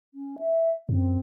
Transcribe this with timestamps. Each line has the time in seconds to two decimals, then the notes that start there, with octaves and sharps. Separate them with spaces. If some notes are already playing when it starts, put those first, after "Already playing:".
0.14 C#4
0.39 E5
0.89 F#2 C4